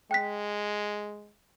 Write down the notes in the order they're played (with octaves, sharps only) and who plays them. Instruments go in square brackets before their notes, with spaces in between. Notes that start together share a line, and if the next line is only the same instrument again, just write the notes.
[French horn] G#3 [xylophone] G5 F#6 B6